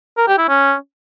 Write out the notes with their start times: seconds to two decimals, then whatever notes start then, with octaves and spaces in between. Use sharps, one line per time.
0.17 A#4
0.28 G4
0.38 E4
0.48 C#4